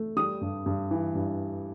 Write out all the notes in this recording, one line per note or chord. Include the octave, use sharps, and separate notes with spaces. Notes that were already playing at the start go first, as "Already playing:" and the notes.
Already playing: A3
G3 D#6
G2
G2
E3
G2